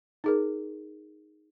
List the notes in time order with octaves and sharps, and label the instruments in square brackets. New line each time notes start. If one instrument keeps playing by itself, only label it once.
[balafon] D#4 G#4 A#4